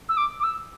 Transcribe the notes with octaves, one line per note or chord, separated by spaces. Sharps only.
E6
D6
D6
E6